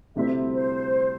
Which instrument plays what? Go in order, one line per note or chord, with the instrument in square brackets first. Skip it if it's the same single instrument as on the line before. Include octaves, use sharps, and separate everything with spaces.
[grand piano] D2 C3 G3 C4 E4 [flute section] E5
[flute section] C5